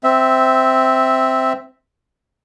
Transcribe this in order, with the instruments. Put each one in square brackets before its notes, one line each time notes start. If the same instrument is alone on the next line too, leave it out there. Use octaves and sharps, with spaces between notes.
[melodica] C4 E5